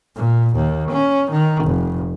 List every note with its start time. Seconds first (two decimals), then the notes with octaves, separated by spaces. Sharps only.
0.16 A#2
0.55 D#2
0.91 C#4
1.31 D#3
1.65 F1